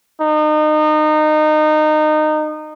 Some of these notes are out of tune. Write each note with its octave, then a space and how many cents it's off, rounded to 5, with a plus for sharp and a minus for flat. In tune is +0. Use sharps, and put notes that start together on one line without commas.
D#4 -25